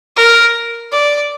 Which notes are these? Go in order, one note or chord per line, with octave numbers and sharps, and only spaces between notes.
A#4
D5